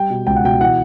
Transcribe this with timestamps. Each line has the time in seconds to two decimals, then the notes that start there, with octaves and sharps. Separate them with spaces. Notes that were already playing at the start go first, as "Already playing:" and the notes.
Already playing: G3 G5
0.10 B2
0.27 C#2 G5
0.36 F#5
0.44 B2 G5
0.61 E3 F#5